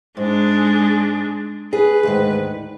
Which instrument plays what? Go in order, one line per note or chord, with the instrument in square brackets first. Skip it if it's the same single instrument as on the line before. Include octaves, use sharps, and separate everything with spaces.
[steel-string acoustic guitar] G#2 [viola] G#3 D4
[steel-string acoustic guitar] G#4 [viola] B4
[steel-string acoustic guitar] D2 G#2 D#3